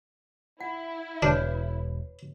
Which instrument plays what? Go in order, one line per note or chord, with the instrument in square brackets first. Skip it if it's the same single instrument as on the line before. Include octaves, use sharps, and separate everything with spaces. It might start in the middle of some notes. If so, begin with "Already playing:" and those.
[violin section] E4 [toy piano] F#5
[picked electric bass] E1 [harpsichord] D4 [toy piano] B4 C#5